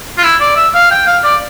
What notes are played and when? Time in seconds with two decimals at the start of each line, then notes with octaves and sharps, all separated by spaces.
0.18 F4
0.23 E4
0.40 D5
0.56 E5
0.74 F5
0.91 G5
1.07 F5
1.24 D5